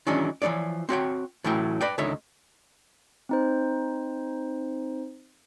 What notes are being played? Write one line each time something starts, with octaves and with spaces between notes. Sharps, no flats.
D#3 E3 F#3 G#3 C#4 D4
E3 F3 D#4 C#5 D5
C4 F#4 C#5 G5
A2 E3 F#3 E4 G5
B4 D5 G5
C#2 D3 D#3 C#5 E5
C4 D#4 C5